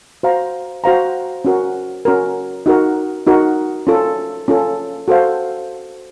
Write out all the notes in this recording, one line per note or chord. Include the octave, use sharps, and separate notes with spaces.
F#4 C5 F5 A#5
F#4 C5 F5 A#5
C#4 F#4 A#4
C#4 F#4 A#4
D#4 F#4 A#4
D#4 F#4 A#4
C#4 F4 A4
C#4 F4 A4
F#4 A4 C5 F5